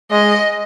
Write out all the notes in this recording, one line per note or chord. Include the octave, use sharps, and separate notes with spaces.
G#3 D#5